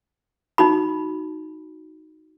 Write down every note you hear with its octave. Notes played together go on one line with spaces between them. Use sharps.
D#4 F#4 B5